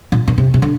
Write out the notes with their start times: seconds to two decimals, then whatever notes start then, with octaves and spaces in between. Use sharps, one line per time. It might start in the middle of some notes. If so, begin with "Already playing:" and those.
0.12 A#2
0.28 A#2
0.38 C3
0.54 C3
0.62 D3